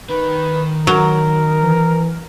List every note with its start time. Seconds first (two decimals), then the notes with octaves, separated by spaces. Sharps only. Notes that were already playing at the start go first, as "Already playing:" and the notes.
0.10 D#3 B4
0.87 F#3 A#4
1.63 E3